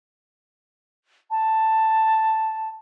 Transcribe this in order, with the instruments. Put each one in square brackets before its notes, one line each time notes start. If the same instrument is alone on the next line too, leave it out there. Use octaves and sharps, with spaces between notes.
[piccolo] A5